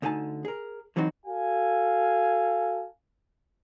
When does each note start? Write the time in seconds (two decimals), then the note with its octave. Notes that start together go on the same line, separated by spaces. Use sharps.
0.02 D2 D3 D#4 G#5 A5
0.45 G#4 A#4
0.96 D3 E3 F#3 C4 D#4 F#4
1.25 F#4 A4 F5 G#5